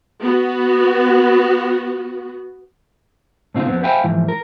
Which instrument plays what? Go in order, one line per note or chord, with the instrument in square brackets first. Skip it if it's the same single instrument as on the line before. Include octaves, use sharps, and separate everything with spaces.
[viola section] B3 F#4
[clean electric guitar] A2 C#3 C4 D#4 F4
F2 B3 C4
C5 E5 F5 G5 G#5 B5
G#2 E3 F3
A#4